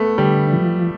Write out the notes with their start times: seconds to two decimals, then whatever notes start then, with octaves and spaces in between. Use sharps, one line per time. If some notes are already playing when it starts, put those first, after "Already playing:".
Already playing: A3 B3
0.18 D3 G3
0.53 F3